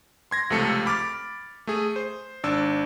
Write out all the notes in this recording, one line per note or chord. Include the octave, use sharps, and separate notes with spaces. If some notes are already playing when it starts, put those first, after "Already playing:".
C6 G#6 A#6
C#2 C3 F3 A3 A4 C#7
B5 D6 F6 A6
A3 G#4
C5
G#1 D4 E6